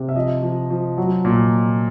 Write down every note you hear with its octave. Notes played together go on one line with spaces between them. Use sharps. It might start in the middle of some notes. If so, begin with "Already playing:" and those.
Already playing: C3
E5
F3 D#5
F3
F3
F#3
A#2